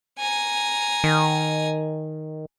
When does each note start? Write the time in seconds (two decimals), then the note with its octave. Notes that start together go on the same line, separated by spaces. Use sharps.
0.19 G#5 A#5
1.04 D#3